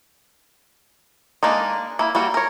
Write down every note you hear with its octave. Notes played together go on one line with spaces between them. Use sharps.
G#3 A#3 D4 D#4
A#3 E4
G3 A#3 F#4
A#4 C#5